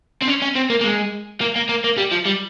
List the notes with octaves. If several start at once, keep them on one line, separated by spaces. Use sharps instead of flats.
C4
C#4
C#4
C4
A#3
A#3
G#3
A#3
A#3
A#3
A#3
G3
F3
G3